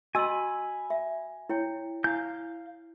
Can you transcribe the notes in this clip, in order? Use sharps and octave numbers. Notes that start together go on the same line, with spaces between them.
F#4 D#5 G#5 B5 E6
E5
E4 C#5 G5
E4 F5 G#5 G6